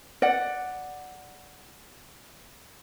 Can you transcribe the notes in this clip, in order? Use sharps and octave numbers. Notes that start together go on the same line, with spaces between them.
D5 F#5